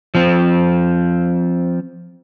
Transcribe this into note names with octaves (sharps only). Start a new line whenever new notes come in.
F3 C4